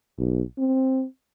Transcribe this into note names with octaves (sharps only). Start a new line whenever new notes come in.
B1
C4